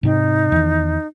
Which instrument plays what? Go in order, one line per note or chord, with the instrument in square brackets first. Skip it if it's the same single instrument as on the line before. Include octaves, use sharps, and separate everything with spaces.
[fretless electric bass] G#2 C3 C4 [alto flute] D#4
[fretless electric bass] E2 D#3